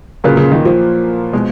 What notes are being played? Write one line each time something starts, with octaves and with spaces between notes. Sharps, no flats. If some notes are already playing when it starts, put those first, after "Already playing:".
A#2 C#3 F#3 A#3 F4 B4
C#3
D#3
F3
B2 G#3